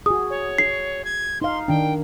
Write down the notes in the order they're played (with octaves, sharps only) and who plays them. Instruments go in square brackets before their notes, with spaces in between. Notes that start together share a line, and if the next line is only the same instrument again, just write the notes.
[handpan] F#4 G#4 [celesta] D#6
[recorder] C#5
[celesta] C7
[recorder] G#6
[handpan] D#4 F5 [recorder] C6
[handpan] D#3 D4 [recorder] G5